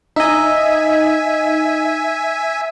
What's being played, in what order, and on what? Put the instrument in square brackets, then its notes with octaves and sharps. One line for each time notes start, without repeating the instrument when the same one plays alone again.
[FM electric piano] D#4 D#5 [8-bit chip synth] E5 G#5